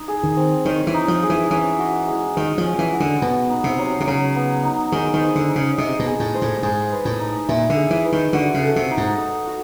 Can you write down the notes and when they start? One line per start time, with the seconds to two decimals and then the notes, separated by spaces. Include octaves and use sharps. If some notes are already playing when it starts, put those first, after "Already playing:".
Already playing: D#4
0.08 G#4
0.23 D#3
0.37 C4
0.65 D#3 C#5
0.87 E3
0.94 D#4
1.08 F3
1.23 G#4
1.30 E3
1.51 E3 C#4
1.79 F#4
2.08 G#3
2.37 D#3 G#3
2.58 F3
2.64 C#4
2.79 E3
2.93 F#4
3.00 D3
3.21 B2 B3
3.50 D#4
3.64 C3
3.79 F#3
4.00 C3
4.07 C#3 F#3
4.35 B3
4.63 D#4
4.92 D#3 G#4
5.14 D#3
5.20 C5
5.35 D3
5.48 D#4
5.55 C#3
5.78 C3 D#5
5.99 B2
6.06 G#4
6.20 A2
6.34 C5
6.42 A2
6.63 G#2 G#4
6.91 B4
7.05 A2
7.20 D#4
7.48 A#2 E5
7.70 D3
7.77 G#4
7.90 E3
8.05 B4
8.12 D#3
8.33 D3 F#4
8.54 C#3
8.62 A4
8.76 C3
8.91 D#4
8.97 G#2
9.18 D#4
9.47 F#4